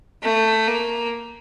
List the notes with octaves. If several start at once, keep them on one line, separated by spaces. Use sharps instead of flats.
A3
A#3